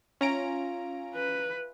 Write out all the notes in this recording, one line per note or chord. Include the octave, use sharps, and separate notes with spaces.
C#4 F4 E5 G#5 A#5 D7
B4